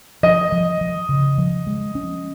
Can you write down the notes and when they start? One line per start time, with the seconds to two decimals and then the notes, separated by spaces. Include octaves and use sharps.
0.23 F3 D#5
0.52 F3
0.81 F3
1.09 C#3
1.38 F3
1.67 G#3
1.95 C#4